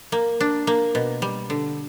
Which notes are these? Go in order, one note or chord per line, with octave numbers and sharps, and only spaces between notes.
A#3
D4
A#3
B2
G3
D3